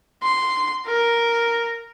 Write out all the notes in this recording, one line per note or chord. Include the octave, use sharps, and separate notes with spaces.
C6
A#4